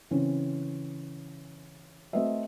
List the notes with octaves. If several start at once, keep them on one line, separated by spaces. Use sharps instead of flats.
C#3 E3 C4 C#4
A3 C4 F#4 B4 D#5 E5